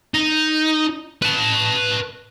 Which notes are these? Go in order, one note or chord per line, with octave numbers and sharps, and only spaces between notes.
D#4
B4 A5